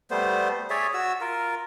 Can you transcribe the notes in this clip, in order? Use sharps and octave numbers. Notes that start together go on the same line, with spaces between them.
G3 A3 B3 C5
G#4 C#5 D5 E5
F#4 E6
F4 A#4